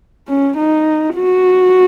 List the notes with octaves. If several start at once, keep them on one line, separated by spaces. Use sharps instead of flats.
C#4
D#4
F#4